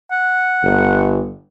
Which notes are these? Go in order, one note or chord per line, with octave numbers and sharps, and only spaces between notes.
F#5
G1